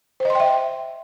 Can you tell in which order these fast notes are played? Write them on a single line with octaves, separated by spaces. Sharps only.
C5 D#5 C6 G5 E5